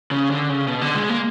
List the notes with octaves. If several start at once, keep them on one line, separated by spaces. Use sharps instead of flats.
C#3
D3
C#3
B2
D3
G#3
A#3